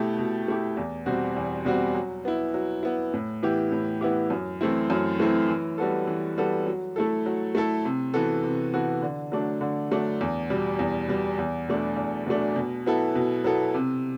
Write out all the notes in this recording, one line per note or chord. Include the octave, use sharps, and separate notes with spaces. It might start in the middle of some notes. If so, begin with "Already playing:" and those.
Already playing: B2 A3 E4 G4
B2
A3 E4 G4
E2
B2 G3 C4 F#4
E2
B2 G3 C4 F#4
F#3
B3 E4
F#3
B3 E4
A2
E3 B3 E4 G4
A2
E3 B3 E4 G4
F#2
E3 A3 C4 E4
F#2
E3 A3 C4 E4
E3
G3 B3 F#4 A4
E3
G3 B3 F#4 A4
F#3
A3 E4 A4
F#3
A3 E4 A4
C3
E3 B3 F#4 A4
C3
E3 B3 F#4 A4
D3
F#3 A3 D4
D3
F#3 A3 D4
E2
B2 G3
E2
B2 G3
E2
B2 F#3 A3 D4
E2
B2 F#3 A3 D4
B2
F#3 B3 E4 A4
B2
F#3 B3 E4 A4
C3